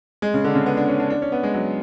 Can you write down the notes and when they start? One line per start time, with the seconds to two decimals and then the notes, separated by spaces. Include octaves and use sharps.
0.22 G#3
0.34 C#3
0.44 D3
0.55 C#3
0.66 B3
0.77 D4
0.88 C#4
1.00 D4
1.10 D4
1.22 C#4
1.32 B3
1.43 G#3
1.54 F#3